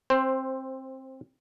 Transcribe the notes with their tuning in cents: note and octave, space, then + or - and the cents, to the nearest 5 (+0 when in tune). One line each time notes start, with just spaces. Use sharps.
C4 +15 C5 +0